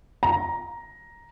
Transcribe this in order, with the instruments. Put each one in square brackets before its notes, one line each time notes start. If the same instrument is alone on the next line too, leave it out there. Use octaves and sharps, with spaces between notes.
[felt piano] A#5